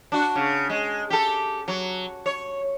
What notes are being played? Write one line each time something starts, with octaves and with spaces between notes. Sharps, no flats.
D4 F#4
C#3
G#3
G4 A4
F#3
C#5